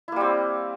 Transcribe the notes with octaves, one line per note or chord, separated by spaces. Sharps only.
G3 A#3 C4 E4